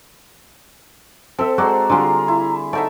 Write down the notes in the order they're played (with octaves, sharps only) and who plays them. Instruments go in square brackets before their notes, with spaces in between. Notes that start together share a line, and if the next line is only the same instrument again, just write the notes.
[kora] C4 E5 [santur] A4
[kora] G#3 A4 C5 [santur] F#4 D5 [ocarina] A#5
[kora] D3 G3 [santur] F4 G#4 C6
[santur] E4
[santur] A3 D#4 E5 [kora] D5 [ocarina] F#5